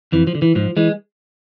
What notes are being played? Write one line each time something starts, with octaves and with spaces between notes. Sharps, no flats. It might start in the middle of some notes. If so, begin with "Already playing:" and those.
F2 E3
F3
D3
E3
G#2 F3
E3 G#3